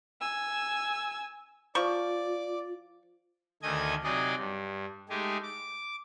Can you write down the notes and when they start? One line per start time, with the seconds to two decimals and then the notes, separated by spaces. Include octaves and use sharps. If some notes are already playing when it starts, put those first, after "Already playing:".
0.21 G#5 E6
1.75 F3 F4 D5 C#6 D6
3.63 D2 D#3 A3 D#5 G#5 G#6
4.04 C3 F#3 D#4 G#4 D5 D#5
4.38 G2
5.09 G#3 A3 D#4 G4 G#4
5.43 D6